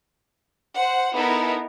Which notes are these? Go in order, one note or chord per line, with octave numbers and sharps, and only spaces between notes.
C5 F#5
B3 D#4 E4 A4 A#4